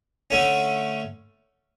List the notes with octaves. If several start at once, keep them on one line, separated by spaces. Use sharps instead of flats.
D3 A3 C#4